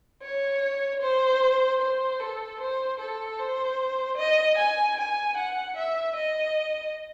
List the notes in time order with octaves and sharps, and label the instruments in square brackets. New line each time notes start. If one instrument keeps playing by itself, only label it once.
[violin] C#5
C5
C5
A4
C5
A4
C5
D#5
G#5
G#5
F#5
E5
D#5